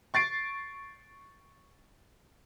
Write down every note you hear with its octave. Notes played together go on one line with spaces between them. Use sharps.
C#6 A6 C7 D7